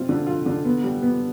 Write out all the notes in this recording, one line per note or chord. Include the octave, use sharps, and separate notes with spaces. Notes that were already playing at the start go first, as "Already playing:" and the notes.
Already playing: G3 C4 F4
D3
F4
D3
B3
G3
B3